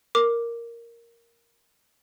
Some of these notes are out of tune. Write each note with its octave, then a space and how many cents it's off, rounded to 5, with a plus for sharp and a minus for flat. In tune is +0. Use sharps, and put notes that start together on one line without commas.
A#4 +0 D6 +0